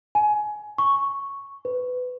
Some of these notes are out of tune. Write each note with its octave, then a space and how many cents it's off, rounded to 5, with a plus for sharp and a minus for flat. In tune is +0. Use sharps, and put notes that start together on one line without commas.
G#5 +20
C#6 +0
B4 +20